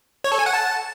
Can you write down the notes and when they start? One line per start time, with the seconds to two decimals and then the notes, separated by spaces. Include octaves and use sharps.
0.24 C#5
0.32 A4
0.39 G#5
0.46 F#5
0.53 A5